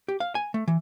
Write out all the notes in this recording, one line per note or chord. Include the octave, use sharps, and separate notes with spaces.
G4
F5
G#5
A3
E3